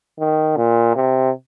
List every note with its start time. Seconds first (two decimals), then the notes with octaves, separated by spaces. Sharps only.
0.19 D#3
0.57 A#2
0.96 C3